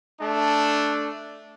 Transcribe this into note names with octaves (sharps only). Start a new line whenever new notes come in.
A3 D4